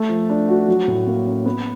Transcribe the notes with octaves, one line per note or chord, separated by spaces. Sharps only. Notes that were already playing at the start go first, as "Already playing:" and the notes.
Already playing: A3
F3
D4
F#4
F#3
A2
A#3
C#4
B3